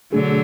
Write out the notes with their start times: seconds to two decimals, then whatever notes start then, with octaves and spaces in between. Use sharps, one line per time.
0.12 B2 D3 F#3 A3 D4 G#4